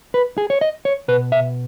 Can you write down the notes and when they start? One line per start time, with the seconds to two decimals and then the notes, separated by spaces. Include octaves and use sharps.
0.14 B4
0.38 G#4
0.50 C#5
0.61 D#5
0.85 C#5
1.08 B2 B4
1.32 E5